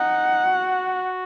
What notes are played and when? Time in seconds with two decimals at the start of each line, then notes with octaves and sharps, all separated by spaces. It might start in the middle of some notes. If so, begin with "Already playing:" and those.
Already playing: D#4 F#5
0.45 F#4